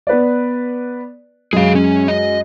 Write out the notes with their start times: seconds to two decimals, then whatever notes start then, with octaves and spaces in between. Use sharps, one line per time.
0.07 B3 B4 D5
1.53 F#2 G#3 G#4 F5
1.75 C#4
2.08 D#5